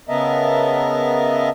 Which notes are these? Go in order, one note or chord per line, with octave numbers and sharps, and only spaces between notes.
C#3 B3 A#4 D#5 E5 A5